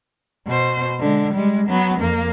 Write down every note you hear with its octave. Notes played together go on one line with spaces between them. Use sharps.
B2 C5
D3 G#3
G3 G#3
F#3 B3
F2 A#3